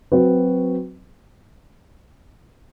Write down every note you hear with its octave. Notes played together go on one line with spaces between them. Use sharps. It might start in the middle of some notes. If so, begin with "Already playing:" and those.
F#3 C4 F#4 B4